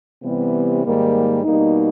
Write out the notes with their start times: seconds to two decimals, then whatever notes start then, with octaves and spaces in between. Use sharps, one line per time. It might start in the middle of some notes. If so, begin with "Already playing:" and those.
0.23 C3 E3 G3 B3
0.83 G#2 D#3 G3 A#3
1.43 B2 G3 A#3 D#4